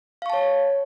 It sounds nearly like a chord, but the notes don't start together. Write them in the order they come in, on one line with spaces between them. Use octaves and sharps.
F5 C#6 A5 C#5